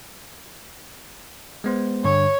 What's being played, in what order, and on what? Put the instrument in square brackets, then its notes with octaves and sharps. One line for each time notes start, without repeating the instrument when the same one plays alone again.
[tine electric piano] G#3 B3 C5
[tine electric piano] G2 D3 [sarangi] C#5